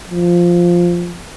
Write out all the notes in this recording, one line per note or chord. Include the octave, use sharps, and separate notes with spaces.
F3